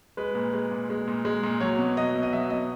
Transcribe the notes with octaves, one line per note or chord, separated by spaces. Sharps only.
G#3 B4
A#2
G#3
A#2
G#3
A#2
G#3
A#2
F#3 C#5
B2
F#3 D#5
B2
D#5
F#3 E5
B2 D#5